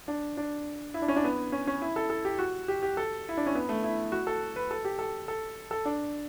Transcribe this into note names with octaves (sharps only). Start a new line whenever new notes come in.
D4
D4
E4
D4
C#4
D4
B3
C#4
C#4
E4
A4
A4
G4
F#4
G4
G4
A4
E4
D4
C#4
B3
A3
E4
F#4
A4
B4
A4
G4
A4
A4
A4
D4